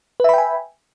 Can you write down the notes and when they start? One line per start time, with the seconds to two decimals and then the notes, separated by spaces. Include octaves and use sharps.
0.20 B4
0.24 E5
0.29 B5
0.34 G5
0.38 G#5